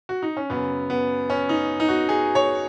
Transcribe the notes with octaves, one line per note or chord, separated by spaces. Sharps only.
F#4
D#4
C#4
F#2 C#3 B3
B3
C#4
D#4
D#4
F#4
G#4
C#5